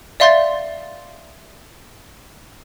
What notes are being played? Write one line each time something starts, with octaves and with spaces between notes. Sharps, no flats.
D5 E5 F5 C6 G6 A6